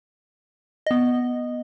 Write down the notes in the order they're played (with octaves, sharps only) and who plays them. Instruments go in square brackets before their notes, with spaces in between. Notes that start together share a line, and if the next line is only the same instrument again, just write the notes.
[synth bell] B3 D#5